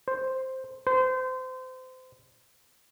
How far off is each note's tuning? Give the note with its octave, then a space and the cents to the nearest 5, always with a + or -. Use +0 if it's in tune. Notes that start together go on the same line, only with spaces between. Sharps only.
C5 +0
C5 -30